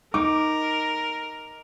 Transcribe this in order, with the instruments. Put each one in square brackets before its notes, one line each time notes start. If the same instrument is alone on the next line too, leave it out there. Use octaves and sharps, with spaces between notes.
[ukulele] D#4 [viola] A#4 [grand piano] D6